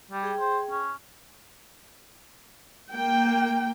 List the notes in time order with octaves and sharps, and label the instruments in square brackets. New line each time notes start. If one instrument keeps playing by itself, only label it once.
[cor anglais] G3
[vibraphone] G#4 G5
[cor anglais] C5
C#4
[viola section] A#3 G5